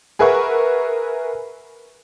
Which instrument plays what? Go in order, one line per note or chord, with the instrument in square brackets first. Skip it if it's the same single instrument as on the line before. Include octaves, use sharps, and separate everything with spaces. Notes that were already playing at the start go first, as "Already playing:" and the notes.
[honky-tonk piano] G#4 A#4 B4 E5 F#5 C#6